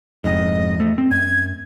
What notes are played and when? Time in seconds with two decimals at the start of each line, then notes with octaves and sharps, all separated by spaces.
0.24 F1 F2 G#2 D#5
0.76 E2 A3
0.98 C4
1.11 F#2 G#6